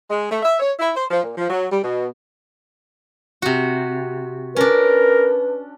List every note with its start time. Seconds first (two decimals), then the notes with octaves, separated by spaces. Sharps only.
0.08 G#3
0.29 A3
0.42 E5
0.58 C#5
0.79 E4
0.94 C5
1.10 F3
1.22 A#2
1.36 F3
1.49 F#3
1.70 G3
1.82 B2
3.42 C3 F#4
4.56 C#4 D4 A#4 B4